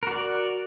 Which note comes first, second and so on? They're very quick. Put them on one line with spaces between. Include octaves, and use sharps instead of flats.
A#4 F#4 D5